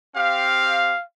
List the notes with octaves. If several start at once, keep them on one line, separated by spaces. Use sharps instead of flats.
C4 G4 F5